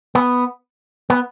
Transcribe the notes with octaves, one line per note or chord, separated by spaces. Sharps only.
B3
B3